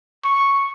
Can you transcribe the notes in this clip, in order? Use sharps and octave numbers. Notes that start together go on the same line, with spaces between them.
C#6